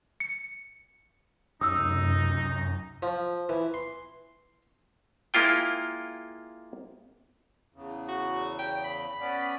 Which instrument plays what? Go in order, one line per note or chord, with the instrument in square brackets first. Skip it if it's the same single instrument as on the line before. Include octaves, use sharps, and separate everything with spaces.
[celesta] C#7
[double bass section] F1 C#2 [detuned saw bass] F#2 [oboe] D#4 [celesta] D#6 E6
[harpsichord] F3
E3
C6
[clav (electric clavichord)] G#3 A#3 E4 F4 G5
[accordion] E2 C#3
[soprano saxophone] F#4
G5
B5
[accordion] B3 C#4 D5